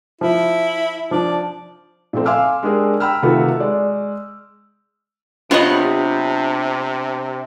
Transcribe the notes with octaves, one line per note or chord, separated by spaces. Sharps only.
F3 E4
F3 D4 D5
A#2 F3 A3 C4
F5 G#5 C6 D6 E6 F6
G#3 D4 G4 G#4 A#4
G5 A#5 B5 E6 F6
C3 D#3 A3 F4 F#4 B4
G#3 D5
C3 B3 D4 F4 F#4 C#5 D#5 B5